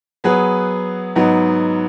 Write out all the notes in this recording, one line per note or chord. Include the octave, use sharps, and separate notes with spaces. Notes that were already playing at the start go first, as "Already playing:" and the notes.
F#3 B3 G#4 B4
G#2 F#3 B3 D#4